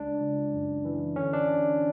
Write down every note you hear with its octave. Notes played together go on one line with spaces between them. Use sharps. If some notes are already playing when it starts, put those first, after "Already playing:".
Already playing: C#2 G#3 D4
C#2
F#2
E3
D3 C#4
D4